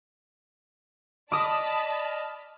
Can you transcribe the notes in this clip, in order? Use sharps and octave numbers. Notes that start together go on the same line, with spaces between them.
D5 D#5 A5 B5 D6 D#6 F6